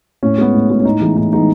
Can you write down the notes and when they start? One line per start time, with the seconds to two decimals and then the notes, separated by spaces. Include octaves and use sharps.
0.23 A2 C#4
0.38 G#3 B3
0.53 A2
0.70 G#3 B3
0.80 C#4
0.85 A2 D#4
1.01 E3 G#3 B3
1.17 A2 D#4
1.32 E3 G#3 B3 D#4